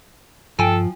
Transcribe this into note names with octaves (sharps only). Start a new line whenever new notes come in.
G2 F3 A4 G5 G#5